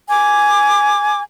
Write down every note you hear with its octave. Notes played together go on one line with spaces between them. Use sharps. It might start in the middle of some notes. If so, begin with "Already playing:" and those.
G#5 D6